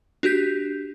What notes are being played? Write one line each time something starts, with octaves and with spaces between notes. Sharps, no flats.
D4 F#4 G4 G6 B6